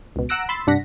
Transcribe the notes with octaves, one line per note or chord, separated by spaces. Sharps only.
C#2 B2
F#5 A#5 E6 F#6 A#6 D7
B5 C6 E6 A6
C2 G2 D4 F#5 A#6 B6